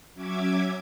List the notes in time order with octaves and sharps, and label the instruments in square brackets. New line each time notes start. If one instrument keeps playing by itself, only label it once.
[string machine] F#3 C#4 E5 D6 G#6